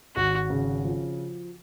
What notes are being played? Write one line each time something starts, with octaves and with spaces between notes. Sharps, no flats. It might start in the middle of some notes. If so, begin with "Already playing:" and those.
G#1 F#4
C#3
F3